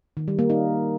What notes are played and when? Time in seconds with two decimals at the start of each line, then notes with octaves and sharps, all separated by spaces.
0.17 D#3
0.28 G3
0.39 A#3
0.50 D#4